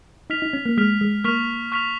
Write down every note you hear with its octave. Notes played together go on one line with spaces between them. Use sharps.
D#4 F6 B6 F7
D#4
C#4
A#3
G#3 F6 B6 F7
G#3
A#3 C#6 F6 B6 F7
C#6 F6 B6 F7